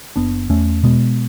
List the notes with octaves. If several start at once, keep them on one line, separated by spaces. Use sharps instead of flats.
F#1 B3 D4
E2 A3 C#4
B2 G#3 B3